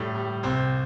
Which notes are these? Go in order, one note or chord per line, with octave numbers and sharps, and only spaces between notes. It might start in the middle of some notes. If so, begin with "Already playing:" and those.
Already playing: A2 G3
G3
C2 C4